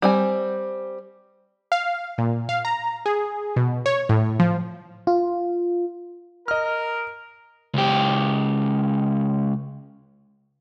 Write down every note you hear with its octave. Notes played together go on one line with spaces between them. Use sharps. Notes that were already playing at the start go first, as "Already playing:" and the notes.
G3 C4 G#5
F5
A#2
F5
A#5
G#4
B2
C#5
A2
F3
F4
A#4 D#5 F6
C#2 G4